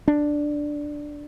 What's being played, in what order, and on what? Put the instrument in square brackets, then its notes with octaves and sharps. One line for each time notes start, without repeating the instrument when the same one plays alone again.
[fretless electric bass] D4